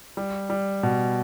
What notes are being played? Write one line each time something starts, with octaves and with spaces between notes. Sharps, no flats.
G3
G3
B2